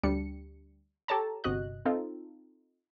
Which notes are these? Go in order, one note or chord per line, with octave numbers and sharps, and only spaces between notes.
D2 G3 D4 C#7
G4 A4 C#5 A5 A#5
G1 C3 F#4 D#5 F#6
C4 D#4 F4 A4